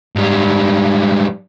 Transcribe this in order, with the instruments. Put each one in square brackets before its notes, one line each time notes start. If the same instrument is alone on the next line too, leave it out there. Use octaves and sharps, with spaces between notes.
[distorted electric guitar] G#2 G3